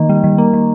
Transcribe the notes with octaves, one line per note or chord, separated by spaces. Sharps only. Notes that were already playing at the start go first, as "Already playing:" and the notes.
Already playing: D#3 A#3
G3
D#3
A#3
D#3